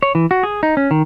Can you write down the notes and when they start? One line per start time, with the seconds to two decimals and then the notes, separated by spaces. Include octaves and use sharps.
0.03 C#5
0.15 E3
0.31 F#4
0.43 G#4
0.63 D#4
0.77 C#4
0.91 D#3